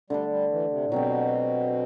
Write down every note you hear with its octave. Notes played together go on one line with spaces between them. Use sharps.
D3 G3 A3 D4
G3
E3
C3
A2
B2 F#3 C4 G4